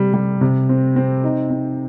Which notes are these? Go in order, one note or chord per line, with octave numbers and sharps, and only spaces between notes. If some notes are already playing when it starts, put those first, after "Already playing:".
Already playing: C3 G3
G3
C3
C4
C4
D#4
C4